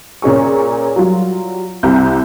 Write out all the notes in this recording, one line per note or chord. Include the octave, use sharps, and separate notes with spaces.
A#2 C#4 G#4 C#6
F#3 G3 F4
C2 C3 C4 G6